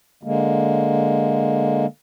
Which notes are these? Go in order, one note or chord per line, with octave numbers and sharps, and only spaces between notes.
D3 G#3 A#3